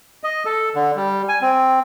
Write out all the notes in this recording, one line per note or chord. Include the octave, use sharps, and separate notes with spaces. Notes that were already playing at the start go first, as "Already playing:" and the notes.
D#5
A4
D3
G3
G#5
C4